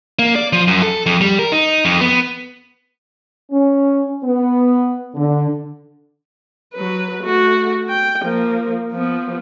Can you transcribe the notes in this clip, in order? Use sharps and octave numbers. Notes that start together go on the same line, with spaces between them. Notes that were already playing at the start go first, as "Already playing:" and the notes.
A#3
D5
F3
F#2
A4
F2
G3
A#4
D#4
F2
B3
C#4
B3
D3
F#3 B4
A3 F#4
G5
F3 A#3
F3 B3